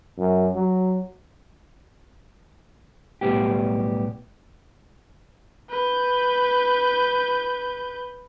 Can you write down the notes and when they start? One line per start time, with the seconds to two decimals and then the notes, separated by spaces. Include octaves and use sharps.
0.18 F#2
0.55 F#3
3.21 B1 A2 G3 B3 G4
5.69 B4 G6